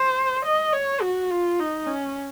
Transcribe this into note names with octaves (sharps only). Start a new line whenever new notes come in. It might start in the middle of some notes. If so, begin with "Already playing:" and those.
Already playing: C5
D#5
C#5
F#4
F4
D#4
C#4